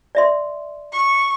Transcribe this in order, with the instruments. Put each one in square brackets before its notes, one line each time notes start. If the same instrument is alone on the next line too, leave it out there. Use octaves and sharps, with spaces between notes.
[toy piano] D5 E5 C6
[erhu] C#6